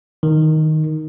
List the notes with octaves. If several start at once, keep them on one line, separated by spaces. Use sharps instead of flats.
D#3